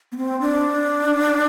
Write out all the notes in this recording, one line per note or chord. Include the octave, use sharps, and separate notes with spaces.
B3
C4
D4